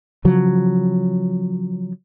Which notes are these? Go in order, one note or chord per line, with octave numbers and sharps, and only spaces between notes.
C#3 F3 F#3